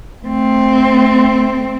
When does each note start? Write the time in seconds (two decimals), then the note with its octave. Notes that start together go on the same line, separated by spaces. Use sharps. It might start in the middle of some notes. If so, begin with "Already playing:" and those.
0.24 A3 C4